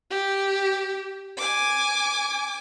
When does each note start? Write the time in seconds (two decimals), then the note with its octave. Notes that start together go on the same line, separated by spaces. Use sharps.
0.10 G4
1.38 G#5 D6